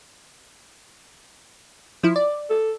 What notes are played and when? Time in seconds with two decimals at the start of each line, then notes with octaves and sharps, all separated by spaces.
2.03 F3 E4
2.16 D5
2.50 A4